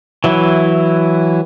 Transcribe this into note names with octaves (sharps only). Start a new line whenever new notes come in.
E3 F#3 E4